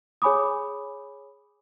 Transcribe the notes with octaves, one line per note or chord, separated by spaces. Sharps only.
G#4 C#5 G#5 B5 D6 D#6